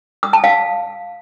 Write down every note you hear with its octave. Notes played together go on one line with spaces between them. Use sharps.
D#6
A5
F5